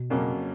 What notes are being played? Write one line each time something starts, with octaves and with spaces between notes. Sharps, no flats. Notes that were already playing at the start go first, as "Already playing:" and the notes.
Already playing: B2
F2 C#3 F#3 A#3 C#4